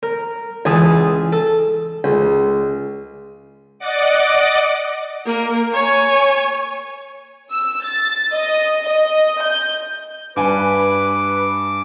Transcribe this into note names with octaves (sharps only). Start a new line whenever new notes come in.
A#4
C#2 E3 G#4 A5 D#6
A4
C#2
D5 D#5 F#5 D6
A#3 A#4
C#5 G#5
E6
A6
D#5
D#5
G6
G2 B4 G#5 D6